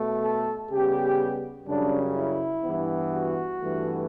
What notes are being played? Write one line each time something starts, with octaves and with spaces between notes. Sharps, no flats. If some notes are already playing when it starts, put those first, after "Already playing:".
Already playing: B2 A3
A4
C#3 G3 B3 G4
F#2 C#3 G3 D4
E4
G2 E3 B3
F#4
G2 E3 A3